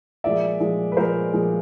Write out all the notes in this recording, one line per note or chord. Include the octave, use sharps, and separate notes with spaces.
A#2 F3 G#3 D5 E5
A#2 F3 G#3
B4
A#2 F3 G#3 A#4 C5
A#2 F3 G#3